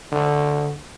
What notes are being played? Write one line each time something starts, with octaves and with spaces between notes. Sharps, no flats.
D3